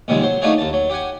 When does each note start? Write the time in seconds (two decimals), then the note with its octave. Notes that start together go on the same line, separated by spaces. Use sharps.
0.08 A#1 F#2 C3 D#3 G3 G#3
0.22 F#3 C5
0.42 A3 D4 D#4 F4 F#4 G#4
0.58 D#2 A5
0.73 F#3
0.90 G4 F#5 G#5